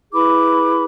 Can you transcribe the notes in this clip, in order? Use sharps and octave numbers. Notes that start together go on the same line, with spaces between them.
E4 G#4 B4 B5 D6